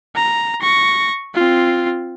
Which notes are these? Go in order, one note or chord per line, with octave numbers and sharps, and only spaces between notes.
A#5
C#6 A#6
C4 F4